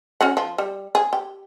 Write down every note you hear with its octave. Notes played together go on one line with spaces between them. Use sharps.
C#4 F#4 F#5
F3
G3
G#4
G4